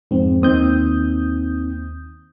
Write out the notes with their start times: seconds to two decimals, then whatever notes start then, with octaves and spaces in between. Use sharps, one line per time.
0.11 F2 G#2 C4
0.42 D#2 A#3 C4 D#4 D#6 G6